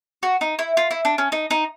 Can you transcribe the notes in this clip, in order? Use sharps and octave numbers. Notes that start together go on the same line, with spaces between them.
F#4
D#4
E4
F4
E4
D4
C#4
D#4
D#4